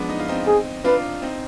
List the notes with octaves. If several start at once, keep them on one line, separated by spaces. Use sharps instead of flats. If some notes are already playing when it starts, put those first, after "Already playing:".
Already playing: F3 G#3 B3 D4
D#4
F4
C4 D#4
G#4
D4 F4 B4
C4 D#4